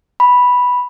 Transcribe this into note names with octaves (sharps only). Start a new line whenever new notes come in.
B5